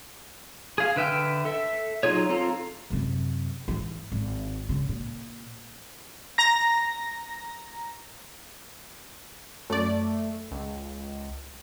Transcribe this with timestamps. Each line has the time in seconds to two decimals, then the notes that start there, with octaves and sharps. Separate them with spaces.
0.78 G#4 F5
0.96 D3 B4 E5 G5 F6
1.45 A4 E5
2.03 F#3 D#4 F4 G#4 C#5
2.29 C4 F4 A4 A#5
2.90 F#2 C3
3.68 G#2 E3
4.12 G#1
4.69 C#3
4.89 A#2
6.38 A#5 A#6
9.70 F#2 A3 D5
10.51 C#2